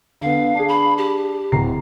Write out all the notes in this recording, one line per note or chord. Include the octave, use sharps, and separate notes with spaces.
D3 B3 F5
D4 G#4
B5
G4
D1 A#5 C7